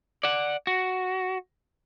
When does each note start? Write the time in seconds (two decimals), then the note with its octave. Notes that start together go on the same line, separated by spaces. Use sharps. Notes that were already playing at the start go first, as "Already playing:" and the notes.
0.23 D5 F#5
0.67 F#4